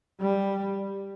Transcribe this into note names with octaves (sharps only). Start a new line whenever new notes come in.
G3